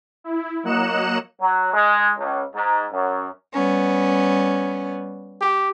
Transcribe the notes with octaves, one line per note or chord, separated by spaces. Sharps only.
E4
F#3 A#3 D#5 F#6 C#7 E7
F#3
G#3
C#2
G#2
F#2
G3 B3 C#4
G4